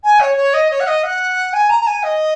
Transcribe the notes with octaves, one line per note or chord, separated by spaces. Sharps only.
G#5
C#5
C#5
D#5
C#5
F#5
D#5
F#5
G#5
A#5
A#5
G#5
D#5